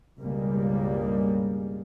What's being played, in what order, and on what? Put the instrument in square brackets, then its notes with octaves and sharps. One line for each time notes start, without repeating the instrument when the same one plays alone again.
[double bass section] C#2 G2 B2 G3 G#3 A#3